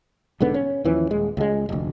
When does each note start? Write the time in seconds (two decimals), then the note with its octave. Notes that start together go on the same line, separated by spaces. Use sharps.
0.40 B1 G#2 D3 B3
0.54 C#4
0.84 D#2 E3 F3 C#4
1.10 D#1 G#3
1.37 C#2 G#3
1.69 F1 D2